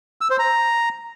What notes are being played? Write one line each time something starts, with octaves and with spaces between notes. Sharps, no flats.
E6
C5
A#5